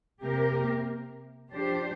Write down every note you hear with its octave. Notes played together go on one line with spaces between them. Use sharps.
C3 A#3 G4 A#4
F3 D4 G4 C5